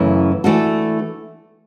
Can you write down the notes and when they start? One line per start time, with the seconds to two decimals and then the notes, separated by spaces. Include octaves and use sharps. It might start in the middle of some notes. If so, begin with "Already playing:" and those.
Already playing: F#2 C#3 E3 A3 C#4
0.44 E3 A3 D4 F#4 A4